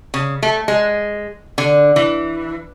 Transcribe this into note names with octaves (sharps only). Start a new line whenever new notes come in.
C#3
A3
G#3
D3
E3